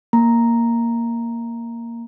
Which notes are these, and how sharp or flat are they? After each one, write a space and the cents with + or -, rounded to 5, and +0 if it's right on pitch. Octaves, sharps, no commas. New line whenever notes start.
A#3 +0 A#5 +0